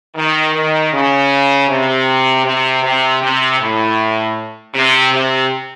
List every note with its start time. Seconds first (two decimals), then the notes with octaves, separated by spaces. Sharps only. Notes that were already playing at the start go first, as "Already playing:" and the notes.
0.16 D#3
0.54 D#3
0.93 C#3
1.69 C3
2.45 C3
2.83 C3
3.22 C3
3.60 A2
4.74 C3
5.13 C3